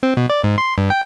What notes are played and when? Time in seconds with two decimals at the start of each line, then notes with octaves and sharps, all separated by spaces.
0.03 C4
0.17 B2
0.30 D5
0.44 G#2
0.58 C6
0.78 G2
0.90 G5